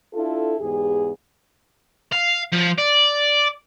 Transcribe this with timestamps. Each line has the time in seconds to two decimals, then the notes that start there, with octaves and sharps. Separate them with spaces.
0.13 D4 E4 F4 A4
0.60 E2 G#2 G4 G#4
2.12 F5
2.53 F3
2.78 D5